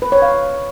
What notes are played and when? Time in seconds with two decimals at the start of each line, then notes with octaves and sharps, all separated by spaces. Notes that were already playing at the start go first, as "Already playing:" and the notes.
0.02 B4
0.12 C#5
0.22 F5